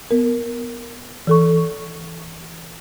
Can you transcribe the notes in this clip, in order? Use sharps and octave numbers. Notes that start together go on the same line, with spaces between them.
B3 A#4
E3 A4 C#6